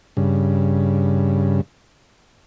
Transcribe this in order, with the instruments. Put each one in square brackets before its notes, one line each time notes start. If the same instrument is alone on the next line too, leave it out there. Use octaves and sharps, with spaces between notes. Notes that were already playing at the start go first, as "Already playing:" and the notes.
[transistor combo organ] G2 C#3